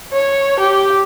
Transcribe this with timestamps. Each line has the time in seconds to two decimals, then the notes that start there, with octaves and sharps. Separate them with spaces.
0.12 C#5
0.60 G4